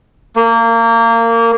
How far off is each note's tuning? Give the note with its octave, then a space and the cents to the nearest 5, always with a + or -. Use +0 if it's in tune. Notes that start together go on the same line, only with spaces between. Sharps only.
A#3 -25